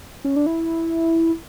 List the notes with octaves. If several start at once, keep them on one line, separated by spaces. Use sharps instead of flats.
C#4
D4
E4